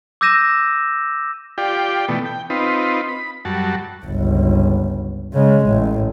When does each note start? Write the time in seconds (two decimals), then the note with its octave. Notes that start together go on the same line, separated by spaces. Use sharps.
0.21 D6 E6 G6 A#6 D#7 E7
1.58 F4 G4 D5 G5
2.08 B2 E3 A3 B3
2.25 G5
2.50 C4 D#4 F4 B4
3.09 B5
3.45 F#2 G3 F#4 A5
4.05 G1 C#2
5.33 C#3 G#3
5.67 A1